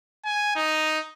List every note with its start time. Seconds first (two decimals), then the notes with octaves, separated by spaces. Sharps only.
0.25 G#5
0.56 D#4